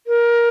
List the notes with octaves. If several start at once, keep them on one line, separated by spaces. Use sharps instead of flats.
A#4